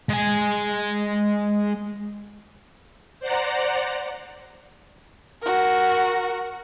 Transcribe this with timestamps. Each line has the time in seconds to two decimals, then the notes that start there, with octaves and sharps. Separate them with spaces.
0.09 G#3 G#5
3.20 C5 D5 F#5 A#5
5.42 F#4 A#4